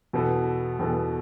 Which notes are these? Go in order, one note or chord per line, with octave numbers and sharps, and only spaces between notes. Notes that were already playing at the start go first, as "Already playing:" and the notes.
E2 B2 B3 A4
E2 B2 B3 A4